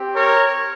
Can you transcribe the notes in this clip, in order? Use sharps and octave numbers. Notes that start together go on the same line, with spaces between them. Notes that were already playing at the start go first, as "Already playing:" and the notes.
Already playing: C4 G4
A#4 C#5